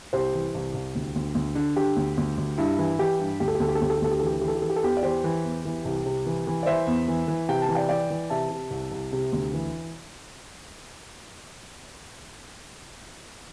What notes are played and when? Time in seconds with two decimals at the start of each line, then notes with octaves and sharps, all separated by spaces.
0.13 C2 G4 C5
0.34 E3
0.54 C2
0.74 C2
0.95 D2
1.16 D2
1.35 D2
1.55 D3
1.76 D3 G4
1.96 D2
2.17 D2
2.37 D2
2.58 G2 E4
2.79 E3
2.99 E3 G4
3.19 G2
3.40 D2 G4
3.48 A4
3.55 G4
3.60 D2 A4
3.68 G4
3.75 A4
3.81 D2 G4
3.90 A4
3.97 G4
4.02 D2 A4
4.11 G4
4.19 A4
4.22 E3 G4
4.33 A4
4.41 E3 G4
4.48 A4
4.55 G4
4.62 E3 A4
4.70 G4
4.76 A4
4.83 E2 G4
4.97 D5
5.03 E3 G4 C5
5.24 E3
5.44 E2
5.65 E3
5.85 C2
6.06 C3
6.26 E3
6.47 E3
6.63 D5
6.66 E3 C5 E5
6.87 E2
7.08 E3
7.28 E3
7.49 C3 G5
7.62 A5
7.69 E3
7.75 D5 G5
7.89 E3 D5 G5
8.10 E3
8.30 C3 E5 A5
8.50 C3
8.71 C2
8.92 C2
9.13 C3
9.32 D2
9.54 E3